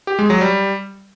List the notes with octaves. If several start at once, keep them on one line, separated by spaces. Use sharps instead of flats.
G4
G#3
F#3
G3